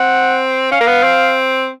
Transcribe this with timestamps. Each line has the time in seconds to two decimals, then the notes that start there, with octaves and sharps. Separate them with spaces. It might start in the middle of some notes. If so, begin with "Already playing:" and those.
Already playing: C4 F#5
0.72 C#4 F5
0.81 A#3
0.88 B3
1.04 C4